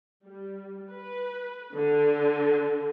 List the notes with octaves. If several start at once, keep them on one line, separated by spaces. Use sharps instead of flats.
G3
B4
D3